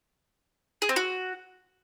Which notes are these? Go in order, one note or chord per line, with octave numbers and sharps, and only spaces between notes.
G#4
C4
F#4